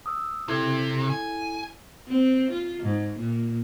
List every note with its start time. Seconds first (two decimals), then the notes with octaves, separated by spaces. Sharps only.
0.06 D#6 E6
0.48 C3 E4 A4 G#6
1.10 G#5
2.08 C4
2.51 F4
2.83 G#2
3.19 A#2